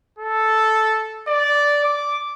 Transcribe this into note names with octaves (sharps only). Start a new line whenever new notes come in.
A4
D5
D6